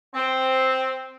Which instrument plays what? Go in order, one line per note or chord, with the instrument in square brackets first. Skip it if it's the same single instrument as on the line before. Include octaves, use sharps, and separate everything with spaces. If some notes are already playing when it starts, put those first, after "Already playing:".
[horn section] C4